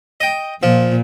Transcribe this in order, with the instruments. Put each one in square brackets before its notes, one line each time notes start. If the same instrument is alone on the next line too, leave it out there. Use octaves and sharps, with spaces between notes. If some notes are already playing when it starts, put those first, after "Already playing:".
[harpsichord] D#5 G5
[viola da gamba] A#2 [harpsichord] F3